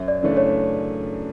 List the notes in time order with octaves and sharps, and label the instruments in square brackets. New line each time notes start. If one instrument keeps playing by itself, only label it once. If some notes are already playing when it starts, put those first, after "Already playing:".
Already playing: [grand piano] F#2 [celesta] E5
[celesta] D5
[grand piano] C#3 E3 A3 D4
[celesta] C#5